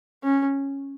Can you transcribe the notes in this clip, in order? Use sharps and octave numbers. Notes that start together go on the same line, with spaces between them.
C#4